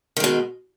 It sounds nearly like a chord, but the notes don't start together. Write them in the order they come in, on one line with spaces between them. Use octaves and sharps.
D#3 G#3 B2